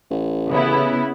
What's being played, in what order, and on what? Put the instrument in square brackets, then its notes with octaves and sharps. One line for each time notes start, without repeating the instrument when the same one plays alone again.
[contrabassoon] A1
[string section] C#3 B3 E4